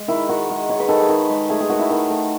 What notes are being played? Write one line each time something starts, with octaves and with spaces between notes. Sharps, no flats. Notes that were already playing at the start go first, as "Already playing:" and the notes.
Already playing: G#3
D#3 E4
D#3 F#4
G#3
G#3 C#5
B4
D#3 A4
G#4
D#3
G#3
A3 G#4
G#4
D#3 F#4
E4
D#3
A3